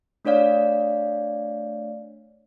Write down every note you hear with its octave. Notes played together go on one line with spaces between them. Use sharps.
A3 D4 C#5 D5 F5